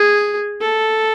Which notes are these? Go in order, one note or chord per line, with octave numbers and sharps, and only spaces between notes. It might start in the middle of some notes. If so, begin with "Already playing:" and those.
Already playing: G#4
A4